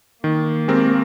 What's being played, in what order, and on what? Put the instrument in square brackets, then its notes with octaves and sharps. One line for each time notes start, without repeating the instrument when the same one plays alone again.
[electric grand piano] D#3 [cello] A#3
[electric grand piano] G#3 C4 G4 A#4